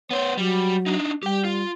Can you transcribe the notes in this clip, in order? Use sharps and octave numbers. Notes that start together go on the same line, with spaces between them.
B3 C5 C#5
F#3 G3
D4 D#4
G3 G4 G5
F4